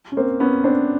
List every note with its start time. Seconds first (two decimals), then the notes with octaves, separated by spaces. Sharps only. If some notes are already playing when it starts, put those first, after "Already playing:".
0.12 C#4
0.17 A#3 C4
0.40 B3 C#4
0.64 C4 D4